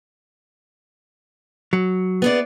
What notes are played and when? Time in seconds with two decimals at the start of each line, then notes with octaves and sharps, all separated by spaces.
1.73 F#3
2.22 B3 G#4 D5